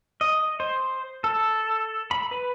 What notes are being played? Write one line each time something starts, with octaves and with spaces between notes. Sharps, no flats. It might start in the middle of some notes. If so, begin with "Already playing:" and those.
D#5
C5
A4
B5
B4